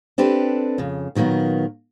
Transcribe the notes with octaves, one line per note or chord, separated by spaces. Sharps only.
C4 D4 G4 A4 B4
F2 C#3
A#2 D#3 F#3 A#3 B3